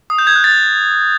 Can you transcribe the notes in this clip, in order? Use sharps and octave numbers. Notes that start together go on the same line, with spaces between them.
D#6
G6
G#6
F#6
A6